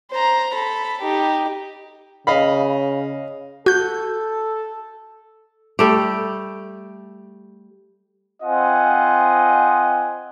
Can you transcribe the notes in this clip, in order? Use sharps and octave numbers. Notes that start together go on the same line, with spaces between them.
C5 A#5
A4 B5
D#4 G4
C#3 D#5 F5 B5
F#4 A4 G6
G3 A3 G4
C4 F4 C5 D#5 F#5 G#5